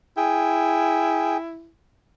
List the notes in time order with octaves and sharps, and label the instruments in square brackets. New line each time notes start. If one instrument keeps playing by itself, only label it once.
[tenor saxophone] E4 [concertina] G#4 G5